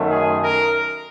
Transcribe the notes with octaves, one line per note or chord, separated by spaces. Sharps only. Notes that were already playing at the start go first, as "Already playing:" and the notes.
Already playing: F#2 D#3 F#3 A3
G#4
A#4